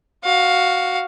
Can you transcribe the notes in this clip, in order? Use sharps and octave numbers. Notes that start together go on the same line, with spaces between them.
F#4 F5